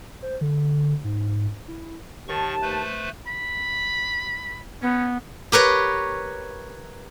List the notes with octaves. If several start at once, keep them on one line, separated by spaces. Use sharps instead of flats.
C5
D3
G#2
E4
D#2 D#3 A5 C#6
A3 B4 C5
B5
B3 C#4
G4 A#4 B4 C#5